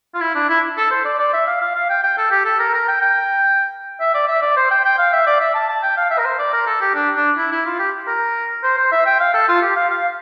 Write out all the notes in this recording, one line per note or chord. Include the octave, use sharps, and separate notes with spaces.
F4
E4
D4
E4
A4
C5
D5
D5
E5
F5
F5
F5
G5
G5
A4
G4
A4
A#4
A#4
G5
G5
E5
D5
E5
D5
C5
G5
G5
F5
E5
D5
E5
A5
A5
G5
F5
E5
A#4
C5
D5
A#4
A4
G4
D4
D4
E4
E4
F4
G4
A#4
C5
C5
E5
G5
F5
A4
F4
G4
F5
F5